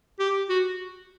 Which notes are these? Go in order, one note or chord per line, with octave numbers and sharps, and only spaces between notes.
G4
F#4